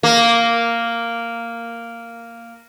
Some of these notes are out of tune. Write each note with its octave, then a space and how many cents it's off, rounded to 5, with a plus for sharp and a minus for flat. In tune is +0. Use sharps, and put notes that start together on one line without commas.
A#3 -5